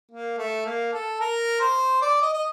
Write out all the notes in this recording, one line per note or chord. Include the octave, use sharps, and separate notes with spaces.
A#3
A3
A#3
A4
A#4
C5
D5
D#5
D#5